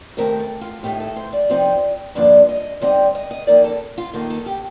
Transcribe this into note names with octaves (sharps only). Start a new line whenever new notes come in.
C3 D#3 A3 C4 A#4
A4
F4
A2 A3 D#4 G4
A4
C5
D5
C3 F3 C4 D#4
G2 D3 F3 A#3 D4 D5
D#5
D3 G3 C4 D#4 D#5
D#5
D#5
F2 D#3 A#3 D5
A4
F4
D#3 A#3 D#4 A4
A4
G4